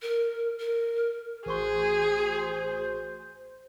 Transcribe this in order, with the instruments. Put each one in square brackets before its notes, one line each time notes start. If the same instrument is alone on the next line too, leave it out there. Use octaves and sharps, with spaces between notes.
[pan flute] A#4
A#4
[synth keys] A1 F#4 C6 [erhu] G#4 [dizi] C5